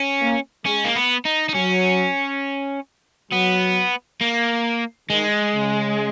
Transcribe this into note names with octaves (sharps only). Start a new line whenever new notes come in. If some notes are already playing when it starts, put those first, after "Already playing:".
Already playing: C#4
A#3
G#3 C#4
A#3
B3
D#4
D#4
F#3 C#4
F#3 B3
A#3
D#3 G#3
C#3